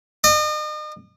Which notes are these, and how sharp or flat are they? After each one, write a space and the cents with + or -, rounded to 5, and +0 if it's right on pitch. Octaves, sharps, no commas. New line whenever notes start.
D#5 -40